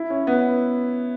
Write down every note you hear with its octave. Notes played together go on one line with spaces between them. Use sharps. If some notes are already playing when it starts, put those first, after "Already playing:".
Already playing: E4
C#4
B3